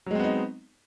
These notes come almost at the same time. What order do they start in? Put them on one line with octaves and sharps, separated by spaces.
F#3 G#3 C4 B3 D#4